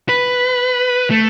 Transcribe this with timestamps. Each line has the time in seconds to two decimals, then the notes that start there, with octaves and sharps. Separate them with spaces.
0.09 B4
1.11 A3